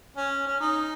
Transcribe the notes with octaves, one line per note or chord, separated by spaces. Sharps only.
C#4
C#4
D#4